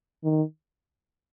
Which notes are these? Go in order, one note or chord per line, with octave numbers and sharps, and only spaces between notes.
D#3